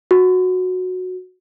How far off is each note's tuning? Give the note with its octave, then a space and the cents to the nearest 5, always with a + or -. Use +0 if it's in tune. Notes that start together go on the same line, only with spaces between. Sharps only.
F#4 -10